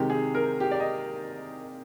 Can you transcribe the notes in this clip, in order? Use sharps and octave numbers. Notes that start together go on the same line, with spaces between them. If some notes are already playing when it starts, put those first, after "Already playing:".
Already playing: C3 D#3 G#3 G4
G#4
A#4
G4
D5
D#5